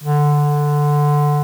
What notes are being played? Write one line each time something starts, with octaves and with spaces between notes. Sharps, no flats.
D3